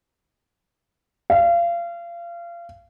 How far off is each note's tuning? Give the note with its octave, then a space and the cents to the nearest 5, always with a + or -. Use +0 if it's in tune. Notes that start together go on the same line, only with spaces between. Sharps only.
F5 -30